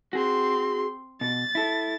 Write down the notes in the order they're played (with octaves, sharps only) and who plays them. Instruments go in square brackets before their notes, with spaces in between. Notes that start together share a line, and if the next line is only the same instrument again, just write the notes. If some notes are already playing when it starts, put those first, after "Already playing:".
[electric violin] C4 C6 [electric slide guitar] F#4 G#4
[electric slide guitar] B2 [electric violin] A6
[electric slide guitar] E4 A4